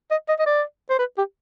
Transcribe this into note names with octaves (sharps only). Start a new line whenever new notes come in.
D#5
D#5
D#5
D5
C5
B4
G4